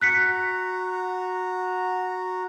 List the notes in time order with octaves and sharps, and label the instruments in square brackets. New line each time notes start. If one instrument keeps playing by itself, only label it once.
[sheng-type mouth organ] F#4 A#5 [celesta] F#6 B6 C#7